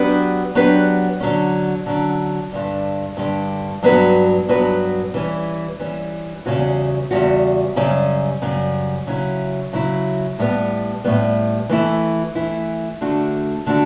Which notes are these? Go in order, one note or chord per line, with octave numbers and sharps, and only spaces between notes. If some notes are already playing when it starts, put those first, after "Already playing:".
Already playing: F#3 B3 D4 G4 B4
F#3 B3 D4 G4 B4
D3 F#3 C#4
D3 F#3 C#4
G2 D3 G3
G2 D3 G3
G2 F#3 B3 F#4 B4
G2 F#3 B3 F#4 B4
E3 G3 C#4
E3 G3 C#4
E2 C#3 G3 C#4 F#4
E2 C#3 G3 C#4 F#4
F#2 C#3 G3 C#4
F#2 C#3 G3 C#4
C#3 F#3 C#4 E4
C#3 F#3 C#4 E4
A2 G3 B3
A2 G3 B3
E3 A3 E4
E3 A3 E4
D3 A3 D4 F#4
D3 A3 D4 F#4